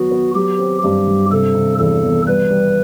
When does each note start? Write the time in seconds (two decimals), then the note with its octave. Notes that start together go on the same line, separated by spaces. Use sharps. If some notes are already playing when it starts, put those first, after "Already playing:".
Already playing: F#3 B3 F#4
0.12 B3
0.35 F#3 G4
0.59 C4
0.83 G2 G4
1.07 G2
1.31 C3 A4
1.55 C3
1.79 E2 A4
2.03 E1
2.27 G3 B4
2.50 G3